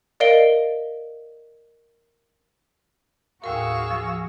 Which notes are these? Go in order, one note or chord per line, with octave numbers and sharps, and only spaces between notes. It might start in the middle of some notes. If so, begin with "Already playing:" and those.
A#4 D5 D#5 F5 D7 G7
D#2 A2 F#4 G#4 A#4 F5 C#6 E6
F3